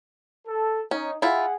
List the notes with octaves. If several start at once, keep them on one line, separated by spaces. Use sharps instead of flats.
A4
C#4 D#4
E4 F4 G#4 F#5